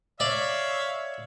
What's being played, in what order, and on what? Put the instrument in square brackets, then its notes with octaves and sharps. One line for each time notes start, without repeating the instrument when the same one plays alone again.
[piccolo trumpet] C#5 [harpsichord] D5 [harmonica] E5 F5